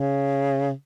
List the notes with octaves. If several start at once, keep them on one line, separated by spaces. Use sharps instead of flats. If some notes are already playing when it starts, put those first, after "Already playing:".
Already playing: C#3